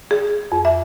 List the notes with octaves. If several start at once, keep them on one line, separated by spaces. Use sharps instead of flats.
G#4
F2
E5